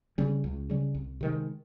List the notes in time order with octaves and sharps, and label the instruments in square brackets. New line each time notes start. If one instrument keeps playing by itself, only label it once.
[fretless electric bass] C#3 G3 C#4
C#2
C#3 G3 C#4
C2
C3 D#3 G#3